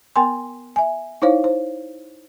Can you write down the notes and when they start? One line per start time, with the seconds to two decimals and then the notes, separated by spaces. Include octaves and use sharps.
0.16 B3 A#4 G5 G#5 C6
0.76 E5 G#5
1.22 D#4 E4 C5 C#5 F5
1.44 C5